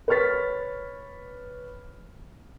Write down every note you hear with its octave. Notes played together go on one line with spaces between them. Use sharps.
B4 C#5 C#6 F6 A6 B6